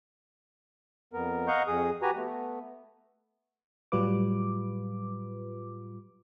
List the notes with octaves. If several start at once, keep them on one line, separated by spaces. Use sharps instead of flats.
F2 B3 A#4
D#5 F5 F#5 A#5 C#6 G6
F2 G#4 D#6
F#4 G4 B4 G#5 A#5
A3 B3
A2 F#3 G3 F4 B4 D6